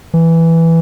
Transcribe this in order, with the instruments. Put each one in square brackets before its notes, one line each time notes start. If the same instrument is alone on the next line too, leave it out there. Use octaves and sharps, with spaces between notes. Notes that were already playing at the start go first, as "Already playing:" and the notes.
[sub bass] E3